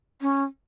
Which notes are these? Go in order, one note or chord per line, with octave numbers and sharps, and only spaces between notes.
C#4